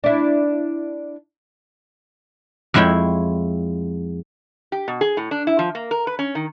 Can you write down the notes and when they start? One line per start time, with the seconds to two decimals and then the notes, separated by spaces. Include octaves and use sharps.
0.04 D4 E4
2.74 F2 G#3 E4 C#5 G5
4.72 G4
4.88 B2
5.01 G#4
5.17 A2
5.31 D4
5.47 E4
5.59 F3
5.75 A#3
5.91 A#4
6.07 B4
6.19 C#4
6.35 D#3